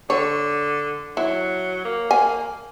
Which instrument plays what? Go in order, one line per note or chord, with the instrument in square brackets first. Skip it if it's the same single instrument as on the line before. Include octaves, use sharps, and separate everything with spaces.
[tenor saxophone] D3 [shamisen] C#5
[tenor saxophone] F#3 [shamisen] E4
[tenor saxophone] A#3
[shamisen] G#5